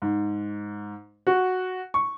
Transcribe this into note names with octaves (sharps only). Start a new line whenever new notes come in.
G#2
F#4
C#6